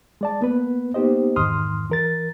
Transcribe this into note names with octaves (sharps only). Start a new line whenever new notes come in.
G#3 D5 A5
A#3 B3 B4
A#3 B3 D#4 G4 C5 D#5
E2 G#2 D#3 C6 D#6 F6
E3 A#4 A6